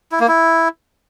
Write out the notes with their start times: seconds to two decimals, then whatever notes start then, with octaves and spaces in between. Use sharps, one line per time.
0.12 E4
0.20 A#3
0.28 E4